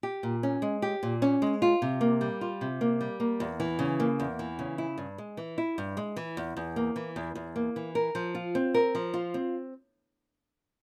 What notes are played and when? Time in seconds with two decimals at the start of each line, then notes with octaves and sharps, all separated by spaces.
0.03 G4
0.23 A#2
0.43 C#4
0.62 G#3
0.82 G4
1.03 A#2
1.22 C#4
1.42 G#3
1.62 F4
1.82 C3
2.01 A#3
2.21 G3
2.41 F4
2.61 C3
2.81 A#3
3.01 G3
3.20 A#3
3.40 E2
3.60 E3
3.79 C#3
4.00 A#3
4.20 E2
4.39 E3
4.59 C#3
4.78 E4
4.98 G2
5.18 G#3
5.37 E3
5.58 E4
5.78 G2
5.97 G#3
6.16 E3
6.37 E2
6.57 E2
6.76 A#3
6.96 E3
7.16 E2
7.35 E2
7.56 A#3
7.76 E3
7.95 A#4
8.15 F3
8.35 F4
8.55 C4
8.74 A#4
8.95 F3
9.14 F4
9.34 C4